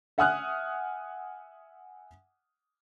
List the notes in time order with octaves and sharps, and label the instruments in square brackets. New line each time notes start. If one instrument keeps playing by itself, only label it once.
[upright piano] E5 F#5 G#5 D#6 F6 F#6